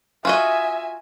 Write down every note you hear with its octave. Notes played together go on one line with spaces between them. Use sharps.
F4 F#4 D#5 E5 G#5